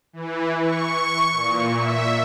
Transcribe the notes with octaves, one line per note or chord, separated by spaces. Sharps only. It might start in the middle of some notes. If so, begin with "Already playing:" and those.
E3
C#6
A#2
E5